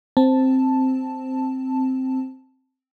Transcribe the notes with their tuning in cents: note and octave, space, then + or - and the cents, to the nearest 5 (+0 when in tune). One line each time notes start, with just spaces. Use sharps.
C4 +0 A5 +0